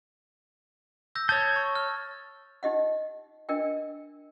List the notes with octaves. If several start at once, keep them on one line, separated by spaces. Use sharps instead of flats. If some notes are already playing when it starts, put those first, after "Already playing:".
E6 G6 A#6
C#5 A5 D#6 G6 A6
C#6
F6
D#4 G4 D#5 F#5
D4 A#4 D#5 G5